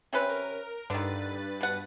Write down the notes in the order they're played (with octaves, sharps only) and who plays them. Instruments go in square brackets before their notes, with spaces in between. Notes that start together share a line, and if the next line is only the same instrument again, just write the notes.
[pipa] C3 C#4 B4 [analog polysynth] C4
[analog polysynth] A#4
[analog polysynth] G2 B4 A6 [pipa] D3 D#3
[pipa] B2 F#5